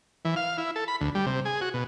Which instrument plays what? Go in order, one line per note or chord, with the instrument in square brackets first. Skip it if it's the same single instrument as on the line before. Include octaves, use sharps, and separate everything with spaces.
[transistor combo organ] E3
F5
E4
A4
B5
D2
G3
C3
G#4
F#4
B2